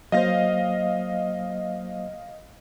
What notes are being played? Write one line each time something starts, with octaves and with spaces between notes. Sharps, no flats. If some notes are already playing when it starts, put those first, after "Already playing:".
F#3 A#3 C5 D#5 F5 A#6